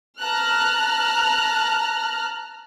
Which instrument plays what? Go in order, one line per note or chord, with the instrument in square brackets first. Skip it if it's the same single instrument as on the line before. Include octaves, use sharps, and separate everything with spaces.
[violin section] A5 A#5 F6 F#6